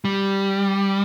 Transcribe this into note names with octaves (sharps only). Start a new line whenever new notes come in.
G3